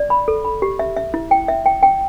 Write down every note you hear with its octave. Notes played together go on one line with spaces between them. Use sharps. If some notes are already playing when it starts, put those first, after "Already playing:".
Already playing: D5
B5
A4
B5
G4
E5
E5
E4
G5
E5
G5
G5